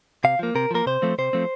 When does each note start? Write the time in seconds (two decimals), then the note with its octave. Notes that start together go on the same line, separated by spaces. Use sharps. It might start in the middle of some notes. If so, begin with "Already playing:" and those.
0.24 C3 F5
0.39 F3 A#3
0.55 C3 A#4
0.71 F3 A#3 A#4
0.86 C3 C5
1.02 F3 A3 C4
1.18 C3 C5
1.33 F3 A3 C4